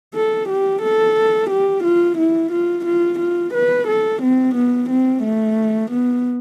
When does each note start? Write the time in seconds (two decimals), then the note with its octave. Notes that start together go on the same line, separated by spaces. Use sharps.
0.15 A4
0.49 G4
0.82 A4
1.50 G4
1.84 F4
2.18 E4
2.52 F4
2.86 F4
3.20 F4
3.54 B4
3.88 A4
4.22 C4
4.55 B3
4.90 C4
5.23 A3
5.91 B3